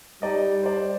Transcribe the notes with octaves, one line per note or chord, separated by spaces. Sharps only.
G3 D#4 D5 D#5
C5 D5